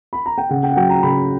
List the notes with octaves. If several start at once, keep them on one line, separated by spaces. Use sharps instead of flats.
B5
A#5
G5
C#3 F#5
G5
F#5
F#3 G5
A#5
C#3 B5